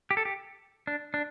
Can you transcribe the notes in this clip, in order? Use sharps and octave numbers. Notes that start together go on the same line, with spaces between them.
G4
A4
G4
D4
D4